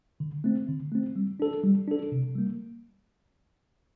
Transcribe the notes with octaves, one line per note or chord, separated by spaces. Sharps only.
D3
A3 C4
D3
A3 C4
G3
D4 A4
G3
D4 A4
C3
G3 A#3